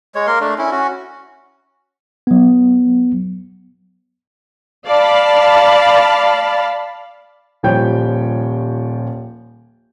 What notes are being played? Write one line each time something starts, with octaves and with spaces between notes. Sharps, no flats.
G#3 C#5
A#3 A#4 C6
A3 D4
C#4 E4
C#4 F#4
F#3 B3
D5 F5 A5 B5
D#1 F3 G3 C#5 G5 G6